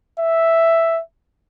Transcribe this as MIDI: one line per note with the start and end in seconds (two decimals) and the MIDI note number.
0.19 1.01 76